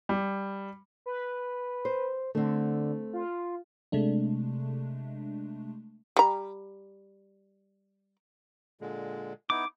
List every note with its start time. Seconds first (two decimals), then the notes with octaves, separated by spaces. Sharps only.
0.09 G3
1.06 B4
1.85 C5
2.35 D3 A3 C4
3.13 F4
3.92 C3 G#3 A3 D4
6.17 G3 A#5
8.81 A#2 D3 G#3
9.50 B3 D#4 E4 D6